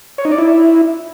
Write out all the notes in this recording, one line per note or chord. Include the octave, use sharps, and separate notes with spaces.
C#5
D#4
D5
E4